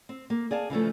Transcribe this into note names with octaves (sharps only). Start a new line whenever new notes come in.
C4
A#3
G#4 D5 F5 A5
C#3 E3 F3 A3